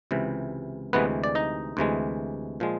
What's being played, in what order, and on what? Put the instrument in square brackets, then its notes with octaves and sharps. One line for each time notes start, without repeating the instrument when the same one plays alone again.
[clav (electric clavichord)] C#2 C3 E3
D2 C3 E3 G#3 B3 B4
D5
D#4 D#5
D2 C3 E3 G#3
A#2 F3 G#3